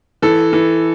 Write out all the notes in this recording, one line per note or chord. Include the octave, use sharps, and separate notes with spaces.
E3 A4
E3